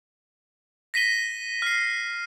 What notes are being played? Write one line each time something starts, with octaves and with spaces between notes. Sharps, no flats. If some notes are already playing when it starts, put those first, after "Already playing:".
A#6 B6 D#7 G7
F6 C7